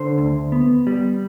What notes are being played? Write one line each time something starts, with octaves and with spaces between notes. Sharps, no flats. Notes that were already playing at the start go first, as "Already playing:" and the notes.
Already playing: D3 C5
D2
B3
G3